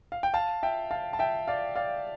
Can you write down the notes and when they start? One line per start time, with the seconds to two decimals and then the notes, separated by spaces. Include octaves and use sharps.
0.12 F5
0.23 G5
0.34 F5 A5
0.63 E5 G5
0.91 F5 A5
1.13 A5
1.19 E5 G5
1.48 D5 F5
1.76 D5 F5